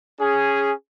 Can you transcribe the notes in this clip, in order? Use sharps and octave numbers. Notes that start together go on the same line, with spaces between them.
C#4 G#4